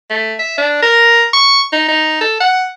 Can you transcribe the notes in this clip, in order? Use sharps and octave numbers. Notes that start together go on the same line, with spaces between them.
A3
E5
D4
A#4
C#6
D#4
D#4
A4
F#5